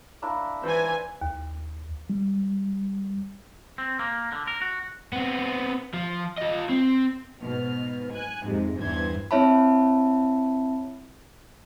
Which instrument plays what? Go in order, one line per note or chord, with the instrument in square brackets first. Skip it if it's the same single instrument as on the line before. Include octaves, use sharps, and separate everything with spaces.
[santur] A#3 D4 E4
[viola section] E3 G#5 [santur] C5
[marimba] D#2
[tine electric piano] G3
[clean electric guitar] C4
A#3
D3
A#4
F#4
[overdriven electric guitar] B3 C4
F3
F4 D#5
C4
[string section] G#2 B2 F6
G#5 F#6
F2 G#2 C3 G#3
E2 G2 E3 C5 G#6
[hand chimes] C4 E4 C#5 E5 A5 B5